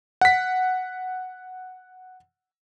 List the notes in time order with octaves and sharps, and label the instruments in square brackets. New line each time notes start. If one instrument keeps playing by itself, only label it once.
[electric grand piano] F#5 B6